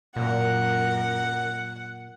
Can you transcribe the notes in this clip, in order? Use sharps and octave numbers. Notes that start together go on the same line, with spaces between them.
F#2 A#2 A#4 F#5